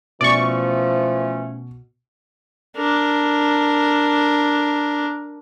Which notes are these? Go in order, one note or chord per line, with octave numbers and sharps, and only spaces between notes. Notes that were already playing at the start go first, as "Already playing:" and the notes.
B2 E3 F3 A3 C#4 D5 C#6
D4 A#4